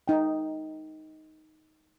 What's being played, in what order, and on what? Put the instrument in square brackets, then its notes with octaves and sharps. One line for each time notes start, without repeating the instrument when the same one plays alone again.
[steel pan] D#4 G5